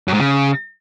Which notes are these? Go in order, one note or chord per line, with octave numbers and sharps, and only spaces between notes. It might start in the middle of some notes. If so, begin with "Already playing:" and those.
F#2
G#2
C#3